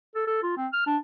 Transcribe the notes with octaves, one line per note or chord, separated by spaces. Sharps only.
A4
A4
F4
C4
F6
D4